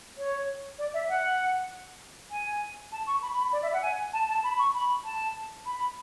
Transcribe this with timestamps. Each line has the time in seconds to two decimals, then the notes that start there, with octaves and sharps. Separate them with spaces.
0.17 C#5
0.79 D5
0.94 E5
1.09 F#5
2.31 G#5
2.92 A5
3.07 C#6
3.22 B5
3.38 B5
3.52 D5
3.63 E5
3.73 F#5
3.83 G#5
4.13 A5
4.29 A5
4.44 B5
4.59 C#6
4.75 B5
5.05 A5
5.66 B5